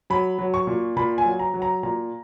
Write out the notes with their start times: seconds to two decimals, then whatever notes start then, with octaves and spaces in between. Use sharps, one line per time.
0.10 F#3 B5
0.38 F#3
0.54 C#6
0.67 A#2
0.97 A#2 B5
1.18 G#5
1.25 F#3
1.39 A#5
1.54 F#3
1.62 A#5
1.83 A#2 A#5